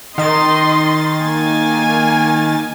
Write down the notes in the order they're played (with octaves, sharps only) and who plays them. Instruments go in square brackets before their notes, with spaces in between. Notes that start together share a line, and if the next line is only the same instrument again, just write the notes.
[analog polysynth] D#3 A6 [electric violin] D#5 C6
[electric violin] A#3 G#5